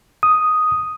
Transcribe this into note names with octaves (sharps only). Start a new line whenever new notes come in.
D#6